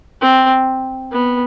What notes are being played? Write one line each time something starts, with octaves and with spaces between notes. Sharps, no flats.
C4
B3